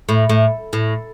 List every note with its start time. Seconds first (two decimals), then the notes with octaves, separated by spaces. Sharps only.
0.09 A2
0.29 A2
0.73 A2